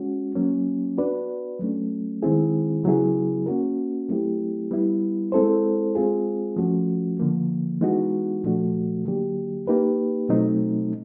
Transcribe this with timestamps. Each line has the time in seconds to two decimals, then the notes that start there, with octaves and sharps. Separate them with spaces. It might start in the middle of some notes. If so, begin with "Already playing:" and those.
Already playing: G#3 C#4 F#4
0.35 F#3 A#3 C#4
0.98 B3 D4 F#4 B4 D5
1.60 F#3 A3 C#4
2.23 D#3 G#3 C4 E4 G#4
2.84 C#3 F#3 B3 E4 G#4
3.46 A#3 C#4 F#4 A#4
4.09 F#3 A3 C4 E4 G4
4.71 G3 B3 E4
5.32 G#3 C4 E4 A4 C5
5.95 G#3 C4 F4 G#4
6.56 F3 A3 C#4 F#4
7.20 D3 F3 A#3
7.81 E3 G#3 B3 D#4 F#4
8.44 A#2 F3 A3 D4 F#4
9.05 D3 F#3 A#3 D4 G4
9.67 A#3 D#4 G4 B4
10.29 B2 F#3 A3 C4 D#4